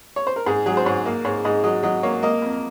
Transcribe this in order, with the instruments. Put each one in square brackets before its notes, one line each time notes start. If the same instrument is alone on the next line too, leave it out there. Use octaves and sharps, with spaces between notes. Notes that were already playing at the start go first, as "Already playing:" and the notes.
[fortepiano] C#5
C5
A#4
G#2 G#4
F#3 G#4
C5
G#2 C#5
A#3
G#2 C#5
G#2 D#5
F#3 D#5
F#3 D#5
A#3 C#5
A#3 D#5
F2